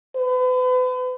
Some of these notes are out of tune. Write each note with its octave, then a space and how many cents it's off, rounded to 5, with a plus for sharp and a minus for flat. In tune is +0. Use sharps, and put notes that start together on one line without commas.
B4 +40